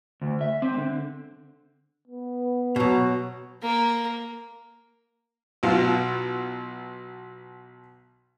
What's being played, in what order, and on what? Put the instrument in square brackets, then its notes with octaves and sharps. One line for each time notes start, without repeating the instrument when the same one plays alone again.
[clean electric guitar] D2
E5
C4
D3
[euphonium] B3
[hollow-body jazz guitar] B2 F#3
[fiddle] A#3
[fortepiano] B1 B2 F4